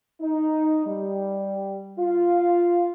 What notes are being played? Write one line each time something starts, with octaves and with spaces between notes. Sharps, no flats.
D#4
G3
F4